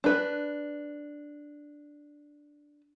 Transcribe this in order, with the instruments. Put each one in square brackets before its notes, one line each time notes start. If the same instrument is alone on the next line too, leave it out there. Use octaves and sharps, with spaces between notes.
[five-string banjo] D4 B4